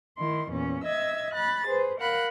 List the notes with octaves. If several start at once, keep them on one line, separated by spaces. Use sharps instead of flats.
D#3 E4 C6
E2 A#2 C#4
D#5 E5 E6 G#6
B5 F#6 A6
G#4 B4 C5
A#4 F5 F#5 B5 F#6